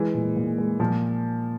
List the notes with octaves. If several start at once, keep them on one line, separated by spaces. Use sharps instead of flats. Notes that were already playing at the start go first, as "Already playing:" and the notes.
Already playing: E3 G#3
A#2
A#2
G#3
A#2 F3